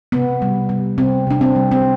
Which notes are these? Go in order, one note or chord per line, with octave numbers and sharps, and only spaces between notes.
C3 B3
G3
G3
C3 C4
C3 D4
C4
G3
C4